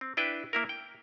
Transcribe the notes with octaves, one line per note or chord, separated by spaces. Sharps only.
C4
D4 E4 B4 G5
A#3 E4 A#4
G5